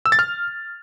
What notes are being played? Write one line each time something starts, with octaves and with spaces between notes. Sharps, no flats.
E6
A6
F6